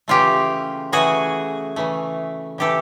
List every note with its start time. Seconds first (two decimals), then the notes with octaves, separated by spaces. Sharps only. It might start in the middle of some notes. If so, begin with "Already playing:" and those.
0.08 C#3 E3 A3 F4 G4
0.92 C#3 E3 A3 F#4 G#4
1.76 C#3 E3 A3
2.58 C#3 E3 A3 G4 A4